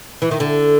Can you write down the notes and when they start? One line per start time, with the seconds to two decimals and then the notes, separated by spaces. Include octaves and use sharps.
0.22 E3
0.31 D#3
0.40 D3